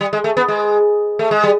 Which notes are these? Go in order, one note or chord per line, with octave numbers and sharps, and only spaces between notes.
G3
G#3
A3
B3
G#3
A3
G#3
G3